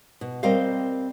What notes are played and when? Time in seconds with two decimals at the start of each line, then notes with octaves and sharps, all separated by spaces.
0.21 B2
0.43 G3 C4 A#4 C5 D#5 F5